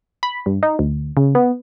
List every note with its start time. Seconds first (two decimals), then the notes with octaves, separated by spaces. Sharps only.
0.23 B5
0.46 G2
0.63 D#4
0.79 D2
1.17 C#3
1.35 B3